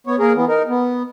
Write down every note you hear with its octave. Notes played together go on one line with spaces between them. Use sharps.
B3 C#5
A#3 G#4 A#4
E3 B3
D#4 A#4
B3